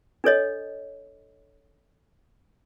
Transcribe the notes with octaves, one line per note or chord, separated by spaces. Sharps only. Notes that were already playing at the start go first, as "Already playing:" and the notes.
D4 A4 C#5 D#5